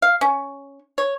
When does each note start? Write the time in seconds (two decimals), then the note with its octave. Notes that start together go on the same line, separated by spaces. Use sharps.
0.02 F5
0.21 C#4
0.98 C#5